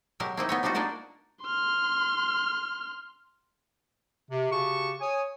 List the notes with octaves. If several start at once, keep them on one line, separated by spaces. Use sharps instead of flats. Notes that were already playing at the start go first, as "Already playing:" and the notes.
B2 F#3 G#3 G4 A#4
A#3 C4 D#4 E4
B3 D#4 C#5
G3 D4 D#4 F4 F#4
A#3 D4 D#4 A#4 D5 F#5
C6 F6
C3
C#3 F#4 G4 A5 C#6
C#5 G#5 D#6